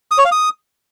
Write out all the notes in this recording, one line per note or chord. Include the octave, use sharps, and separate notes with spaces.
D#6
C#5
F5
D#6